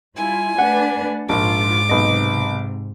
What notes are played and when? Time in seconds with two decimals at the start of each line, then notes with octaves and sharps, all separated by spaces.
0.17 G3 E4 F4 G#5
0.58 A3 D4 B4 F#5
1.29 A#1 G#2 F4 D6
1.89 B1 C3 D#5